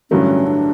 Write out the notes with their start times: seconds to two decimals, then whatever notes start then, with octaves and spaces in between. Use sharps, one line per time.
0.11 A1 G2 D3 F#3 A3 C#4
0.47 D4